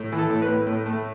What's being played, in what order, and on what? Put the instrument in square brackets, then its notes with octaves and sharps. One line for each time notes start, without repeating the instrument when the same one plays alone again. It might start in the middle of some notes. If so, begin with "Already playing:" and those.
Already playing: [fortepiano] A2
E3
A4
A2
B4
A2
A2
A3